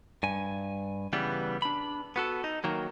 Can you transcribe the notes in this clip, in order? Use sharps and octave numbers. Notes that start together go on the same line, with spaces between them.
G2 G#5
C#3 E3 G3 B3
D4 B5
B3 F#4 A4
D#4
D#3 F#3 A#3